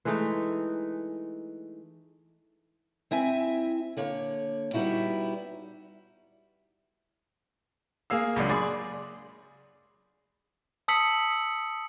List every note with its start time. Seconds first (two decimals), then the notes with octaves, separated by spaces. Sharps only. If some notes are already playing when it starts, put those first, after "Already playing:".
0.05 E3 G#3 A3 D#4
3.11 C4 E4 E5 G#5
3.97 D3 A#3 C#5
4.73 G3 B3 D#4 E4 F#4
8.10 A#3 G#4 F5 E6
8.36 C#2 F#2 D4
8.49 G#4 D5 B5 C6
10.88 A5 D#6 E6 B6 C#7 F#7